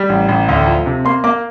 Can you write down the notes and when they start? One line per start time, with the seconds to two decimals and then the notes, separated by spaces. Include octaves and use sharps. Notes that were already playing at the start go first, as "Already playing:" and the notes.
Already playing: G3
0.09 A1
0.29 A1
0.49 D2
0.67 F3
0.86 C3
1.05 A#3 C6
1.24 A#3 D6